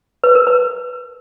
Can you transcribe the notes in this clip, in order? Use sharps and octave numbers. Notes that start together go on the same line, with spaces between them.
B4
A#4
B4